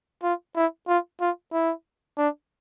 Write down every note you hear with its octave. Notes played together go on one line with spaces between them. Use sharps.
F4
E4
F4
F4
E4
D4